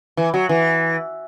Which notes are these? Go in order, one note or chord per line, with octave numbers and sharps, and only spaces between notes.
E3
F#3
E3